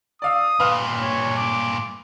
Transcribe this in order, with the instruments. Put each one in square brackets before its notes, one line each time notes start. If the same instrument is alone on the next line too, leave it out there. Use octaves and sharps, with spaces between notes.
[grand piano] D5 F5 E6 [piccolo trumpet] D#6
[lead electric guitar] G2 A#2 [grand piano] B4 F5 F6
[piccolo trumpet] C#5
D6